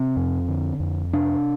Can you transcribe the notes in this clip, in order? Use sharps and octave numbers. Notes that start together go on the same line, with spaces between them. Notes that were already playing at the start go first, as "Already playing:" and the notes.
Already playing: C3 C4
F2
D3
F2
C3 D4